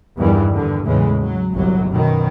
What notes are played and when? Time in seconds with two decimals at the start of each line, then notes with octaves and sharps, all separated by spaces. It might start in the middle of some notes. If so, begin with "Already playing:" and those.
0.17 E2 G2 D#3 E3 G3
0.53 G2 D3
0.85 E2 A2 C#3 E3 G#3
1.21 F#3
1.54 G1 C2 A#2 F#3
1.90 F#2 B2 D#3